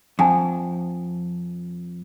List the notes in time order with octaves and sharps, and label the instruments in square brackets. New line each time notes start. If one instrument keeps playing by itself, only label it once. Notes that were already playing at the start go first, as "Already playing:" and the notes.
[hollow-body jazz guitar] F2 [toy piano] F#5 G#5 A5